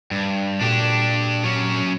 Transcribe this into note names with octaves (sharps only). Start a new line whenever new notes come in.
G2
A#2 D4 F#4 G4 A4
F#3 C#4